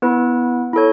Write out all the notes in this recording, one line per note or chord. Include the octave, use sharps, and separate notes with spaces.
B3 E4 B4
E4 A4 C#5